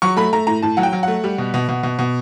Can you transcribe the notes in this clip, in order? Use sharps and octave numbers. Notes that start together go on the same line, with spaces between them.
F#3 C#6
A3 B5
A3 A#5
A2 A#5
A2 A5
F#3 F#5
G5
F#3
A3 F#5
G3
B2
B2
B2
B2
B2